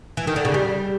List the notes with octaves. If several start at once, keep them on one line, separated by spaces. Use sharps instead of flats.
E3
D#3
D3
C#3
G3